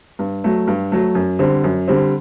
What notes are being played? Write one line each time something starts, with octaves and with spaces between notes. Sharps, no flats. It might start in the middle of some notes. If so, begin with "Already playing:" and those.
G2
F#3 A3
G2
F#3 A3
F#2
D3 G3 C4
F#2
D3 G3 C4